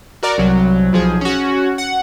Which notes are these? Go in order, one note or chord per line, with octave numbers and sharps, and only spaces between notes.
F#4 A#4 D5
C2 F#3
B1 F3 G#4
C#4 F#4
F#5